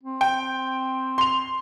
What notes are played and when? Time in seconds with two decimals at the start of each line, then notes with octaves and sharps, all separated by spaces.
0.03 C4
0.21 G5
1.18 C6 F7